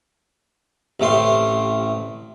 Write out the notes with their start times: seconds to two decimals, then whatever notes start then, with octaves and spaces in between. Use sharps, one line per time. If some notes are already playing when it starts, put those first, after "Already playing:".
1.00 A1 C3 A3 C6